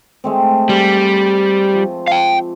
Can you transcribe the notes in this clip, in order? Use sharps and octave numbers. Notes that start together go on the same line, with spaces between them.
G#3 A3 C4
G3 G5 D6
F3
F5 G5